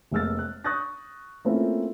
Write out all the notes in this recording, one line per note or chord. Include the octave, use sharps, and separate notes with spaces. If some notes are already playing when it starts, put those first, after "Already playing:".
F1 G#3 A#3 E6 F6 A6
F#6
C#6 D#6 F#6 G6 A6 A#6
A3 A#3 C4 C#4 E4 F4